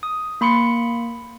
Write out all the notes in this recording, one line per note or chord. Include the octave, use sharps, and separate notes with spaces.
D#6
A#3 B5 C6 C#7